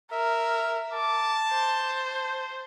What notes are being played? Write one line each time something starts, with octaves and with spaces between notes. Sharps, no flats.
A#4 E5
A5 D6
C5